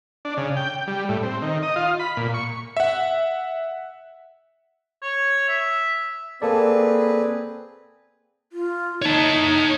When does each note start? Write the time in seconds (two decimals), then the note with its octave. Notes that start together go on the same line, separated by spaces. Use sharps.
0.25 D4
0.37 C#3
0.56 G5
0.87 G3
1.09 A2
1.23 C4
1.42 D#3
1.62 D#5
1.76 F4
1.99 B5
2.17 A#2
2.34 C#6
2.77 E5 F#5
5.02 C#5
5.49 E5
6.42 A#3 C4 G#4 A4 B4 D5
8.53 F4
9.02 D#4 C#5 A5